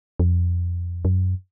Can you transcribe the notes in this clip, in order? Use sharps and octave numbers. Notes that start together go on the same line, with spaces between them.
F2
F#2